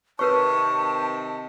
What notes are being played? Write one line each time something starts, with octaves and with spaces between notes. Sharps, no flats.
C3 D#3 A#4 B4 C#5 A5 C#6